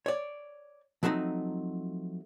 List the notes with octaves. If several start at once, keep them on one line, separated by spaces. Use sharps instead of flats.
C#5 D5
F3 F#3 A3 C4 D#4